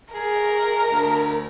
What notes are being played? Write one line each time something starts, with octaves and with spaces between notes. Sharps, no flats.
G#4 A#4
D2